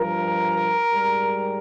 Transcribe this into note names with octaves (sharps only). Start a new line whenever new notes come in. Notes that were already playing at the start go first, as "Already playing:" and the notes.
Already playing: G2 F3 A#4
G#2 G3